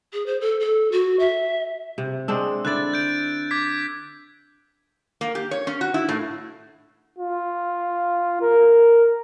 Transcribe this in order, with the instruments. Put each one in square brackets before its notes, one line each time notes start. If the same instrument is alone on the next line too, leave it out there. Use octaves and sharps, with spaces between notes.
[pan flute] G#4
C5
A4
A4
F#4
E5
[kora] C3
[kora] G#3 C4 D4 [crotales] E6
[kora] D3 E4 D5 [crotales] F#6 A6
[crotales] G6 D7
D6 G#6 B6
[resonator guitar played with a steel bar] A#3
G4
C#5
C#4
F#4
E4
A2
[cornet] F4
A#4